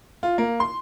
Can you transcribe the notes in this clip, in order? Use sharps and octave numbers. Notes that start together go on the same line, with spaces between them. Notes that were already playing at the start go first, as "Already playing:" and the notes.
F4
A#3
C6